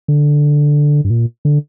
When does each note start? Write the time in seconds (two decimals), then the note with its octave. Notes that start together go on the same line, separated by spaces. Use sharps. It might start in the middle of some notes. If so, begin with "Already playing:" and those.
0.08 D3
1.05 G2
1.10 A#2
1.45 D3